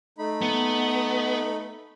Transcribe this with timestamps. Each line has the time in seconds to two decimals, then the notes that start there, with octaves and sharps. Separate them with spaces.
0.18 A3 D#4 B5
0.42 B3